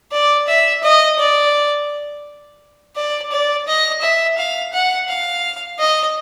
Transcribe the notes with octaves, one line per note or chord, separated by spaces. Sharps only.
D5
E5
D#5
D5
D5
D5
D#5
E5
F5
F#5
F5
D#5